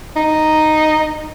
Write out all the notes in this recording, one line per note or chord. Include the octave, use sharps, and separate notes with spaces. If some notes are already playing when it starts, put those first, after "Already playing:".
D#4